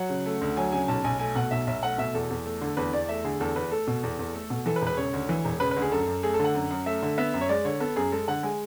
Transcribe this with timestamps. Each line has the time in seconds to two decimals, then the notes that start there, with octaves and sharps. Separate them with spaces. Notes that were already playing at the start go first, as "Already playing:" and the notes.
Already playing: F#3 F#5
0.09 C#3
0.26 A3
0.41 D2
0.57 F#3 G#5
0.72 C#3 G#5
0.88 B1 A5
1.04 B1 G#5
1.20 A3 G#5
1.36 B2 F#5
1.51 B1 E5
1.67 B1 E5
1.83 A3 F#5
1.98 B2 E5
2.14 E2 A4
2.30 E2
2.45 A3
2.62 D3
2.77 E2 B4
2.93 E2 D5
3.09 A3 E5
3.24 D3 G#4
3.40 E2 A4
3.56 E2 B4
3.71 A3 A4
3.87 B2
4.03 E2
4.19 E2
4.34 A3
4.50 B2
4.66 E3 A4
4.76 B4
4.82 E1
4.87 B4
4.97 C#3 C#5
5.13 D2
5.29 E3
5.45 E1
5.60 C#3 B4
5.71 B4
5.76 D2
5.82 G#4
5.92 F#2 A4
6.07 F#2
6.23 A3 G#4
6.34 A4
6.39 D3
6.44 F#5
6.55 F#2
6.71 F#2
6.86 A3 E5
7.02 D3
7.18 B3 E5
7.34 F#2
7.41 C#5
7.49 G#3 D5
7.65 D3 C#5
7.80 B3 A4
7.96 F#2 G#4
8.12 G#3 A4
8.28 D3 F#5
8.43 G#3 G#5